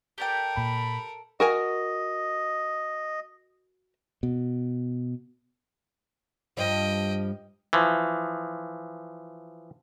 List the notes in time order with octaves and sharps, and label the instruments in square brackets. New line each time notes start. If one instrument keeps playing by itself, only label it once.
[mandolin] G4 D5 G5 [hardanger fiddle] A4 A#4
[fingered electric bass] A#2 [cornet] B5
[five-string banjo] F#4 A#4 G#5 [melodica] D#5
[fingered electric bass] B2
[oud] G2 F3 [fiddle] D#5 G5
[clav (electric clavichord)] E3 F3